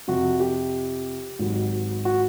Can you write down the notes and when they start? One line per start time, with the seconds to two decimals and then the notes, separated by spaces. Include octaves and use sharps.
0.08 F2 C3 F3 F#4
0.40 G4
1.39 G#1 G#2 D#3 F#3
2.05 F#4